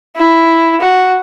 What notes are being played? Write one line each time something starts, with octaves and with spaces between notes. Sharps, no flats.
E4
F#4